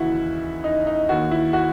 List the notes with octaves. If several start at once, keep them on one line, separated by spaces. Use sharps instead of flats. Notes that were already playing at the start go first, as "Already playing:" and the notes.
Already playing: D#2 C#3 E3 E4 F#4
D#4
D#4
D#2 D#3 F#4
E4
F#4